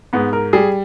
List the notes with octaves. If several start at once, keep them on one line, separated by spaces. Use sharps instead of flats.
G#2 B3
A#4
G3 G#4